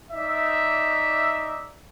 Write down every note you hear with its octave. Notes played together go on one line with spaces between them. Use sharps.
D#4 D5 E5